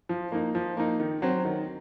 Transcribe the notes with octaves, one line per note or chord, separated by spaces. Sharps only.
F3
A#3 D#4
F3
A#3 D#4
D#3
F#3 C4
D#3